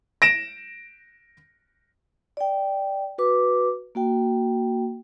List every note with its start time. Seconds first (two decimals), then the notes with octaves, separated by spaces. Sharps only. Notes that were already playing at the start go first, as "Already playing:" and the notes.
0.22 A#6 D7 E7
2.37 D5 G5
3.18 F#4 B4 D6
3.95 A#3 F#4 G5